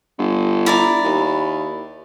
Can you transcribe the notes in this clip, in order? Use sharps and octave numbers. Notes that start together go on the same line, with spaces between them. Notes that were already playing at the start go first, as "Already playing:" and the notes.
G1
E4 D5 A#5
D#2